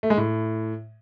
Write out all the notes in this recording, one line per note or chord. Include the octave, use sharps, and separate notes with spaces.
A3
G#3
A2